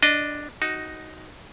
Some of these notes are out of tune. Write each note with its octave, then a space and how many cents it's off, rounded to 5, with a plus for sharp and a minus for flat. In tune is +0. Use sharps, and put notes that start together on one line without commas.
D4 +0 D#5 -15
D#4 +0 F#4 +10